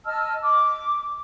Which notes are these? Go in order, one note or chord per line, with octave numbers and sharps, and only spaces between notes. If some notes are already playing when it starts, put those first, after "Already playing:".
D#5 A5 E6 F6
D6